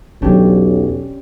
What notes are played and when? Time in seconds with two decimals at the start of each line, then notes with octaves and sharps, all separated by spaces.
0.22 B1 E2 F#3 C#4 D4 G4